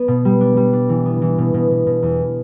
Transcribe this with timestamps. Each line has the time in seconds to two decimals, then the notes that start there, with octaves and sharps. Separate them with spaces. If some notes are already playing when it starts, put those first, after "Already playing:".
Already playing: B3
0.08 B2
0.25 G3
0.41 D4
0.57 G3
0.73 D4
0.89 E3
1.05 B3
1.22 E3
1.38 B2
1.54 B2
1.71 B2
1.86 B2
2.03 E2